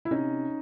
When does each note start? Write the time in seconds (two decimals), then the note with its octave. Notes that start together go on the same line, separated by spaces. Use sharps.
0.05 E4
0.11 C3 C#4 D#4